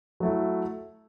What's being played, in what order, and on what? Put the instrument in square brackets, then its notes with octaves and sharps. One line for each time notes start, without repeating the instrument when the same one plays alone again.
[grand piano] F#3 A3 E4